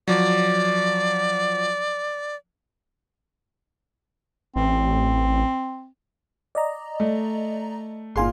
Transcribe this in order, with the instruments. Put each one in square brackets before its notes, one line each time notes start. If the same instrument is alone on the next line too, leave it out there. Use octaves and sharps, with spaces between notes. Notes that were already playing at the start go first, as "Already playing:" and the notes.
[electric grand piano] F3 F#3 [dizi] D5
[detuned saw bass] A1 [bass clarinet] C4
[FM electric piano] D5 D#5 A#5
[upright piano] A3
[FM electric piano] G1 G#4 G#5 [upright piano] A#2 F5 C6